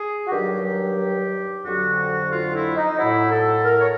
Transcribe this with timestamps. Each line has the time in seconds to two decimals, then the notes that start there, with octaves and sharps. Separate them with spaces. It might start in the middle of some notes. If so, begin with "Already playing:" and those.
Already playing: G#4
0.27 F#4
0.32 G2 D#3 F#3 G4
1.65 F2 D3 F#3 F#4
2.31 F4
2.54 E4
2.76 D#4
2.98 A2 F#3 E4
3.31 A4
3.65 A#4
3.80 C#5